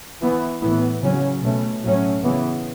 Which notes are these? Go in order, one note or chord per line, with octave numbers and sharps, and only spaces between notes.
E3 B3
A2 E3 B3
C#3 F#3 C#4
B2 A3 C#4
A2 F#3 A3 C#4
C#3 E3 B3